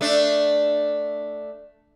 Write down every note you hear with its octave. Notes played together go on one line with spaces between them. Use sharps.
A3 D4